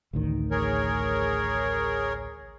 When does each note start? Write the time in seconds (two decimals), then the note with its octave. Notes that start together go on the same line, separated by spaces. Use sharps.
0.13 A1 D2 D#3
0.51 G#4 A#4 C#5